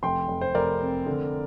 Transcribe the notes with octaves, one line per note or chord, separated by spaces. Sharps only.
F1 G5 C6
F1
C5
F1 A#4 D5
C4
D3